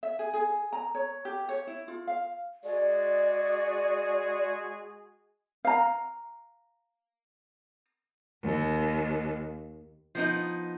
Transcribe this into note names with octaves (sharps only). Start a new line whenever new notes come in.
E5
G#4
G#4
A#5
C#5
G4
C#5
E4
F4
F5
G#3 F#4 G#4 D5
F5 A#5
D#2
F3 B3 D#4